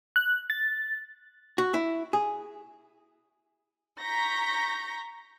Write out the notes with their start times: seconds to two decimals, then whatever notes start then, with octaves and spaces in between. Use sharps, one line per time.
0.16 F#6
0.50 A6
1.58 F#4
1.74 E4
2.13 G#4
4.00 A#5 C#6 G6 A#6 B6